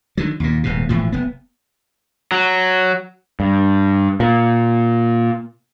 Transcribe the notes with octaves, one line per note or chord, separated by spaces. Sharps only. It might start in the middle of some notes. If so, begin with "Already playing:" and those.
D3 D#3 F#3
D#2 A#2
D#1 G#2 B2
E1 A2 E3 F3
F1 B3
F#3
G2
A#2